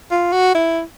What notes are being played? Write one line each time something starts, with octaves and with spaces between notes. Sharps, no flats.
F4
F#4
E4